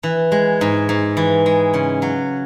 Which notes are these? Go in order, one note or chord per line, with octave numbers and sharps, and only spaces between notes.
E3
G#3
G#2
G#2
E3
G#3
C#3
F#3